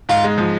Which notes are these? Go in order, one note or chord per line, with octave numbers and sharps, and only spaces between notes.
G#2 F4
G#3
F3